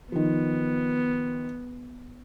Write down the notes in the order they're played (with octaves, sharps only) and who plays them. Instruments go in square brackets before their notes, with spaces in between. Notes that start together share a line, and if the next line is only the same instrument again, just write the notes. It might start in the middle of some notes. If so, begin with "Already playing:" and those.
[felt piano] D#3 F3 [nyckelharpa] B3